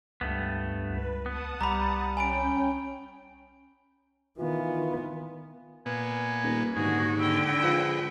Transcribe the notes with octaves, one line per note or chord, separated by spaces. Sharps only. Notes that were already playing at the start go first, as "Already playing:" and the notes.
C#2 G2 A3 B3
C#2 B4
B3 F#5 A5 D#6
C2 G3 A#5 B5
C#4 G5 G#5 B5 D7
D#3 E3 B3 F4
A#2 B3 G#5
D#1 A#3
D#2 G#2 D3 F#4 G#4
D3 E4 G5
F3 G#3 B4